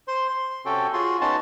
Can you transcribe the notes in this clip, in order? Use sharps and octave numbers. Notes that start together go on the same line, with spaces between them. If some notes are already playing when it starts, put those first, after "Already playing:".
C5 C6
C6
C3 C#4 F#4 A4 G5
F4 F#4 G#4 C6
B3 C#4 D#4 F#4 A5 C6